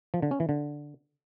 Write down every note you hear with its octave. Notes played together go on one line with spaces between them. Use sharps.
F3
D3
C#4
E3
D3